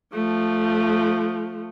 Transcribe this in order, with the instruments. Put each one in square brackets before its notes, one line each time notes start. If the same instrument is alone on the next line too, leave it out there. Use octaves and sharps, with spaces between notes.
[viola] F3 A3